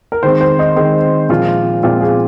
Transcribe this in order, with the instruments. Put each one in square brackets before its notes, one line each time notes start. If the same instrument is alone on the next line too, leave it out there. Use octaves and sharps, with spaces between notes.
[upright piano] A#4
D#3 G#3 C4 C5
C5
D#4
D#3 G#3 C4 D#4
A#2 F3 G#3 C4 F4
A#2 F3 G#3 C4 F4
G#4